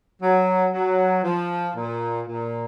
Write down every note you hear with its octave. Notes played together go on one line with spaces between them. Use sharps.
F#3
F#3
F3
A#2
A#2